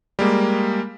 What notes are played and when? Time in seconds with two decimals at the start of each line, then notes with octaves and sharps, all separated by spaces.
0.19 G3 G#3 A#3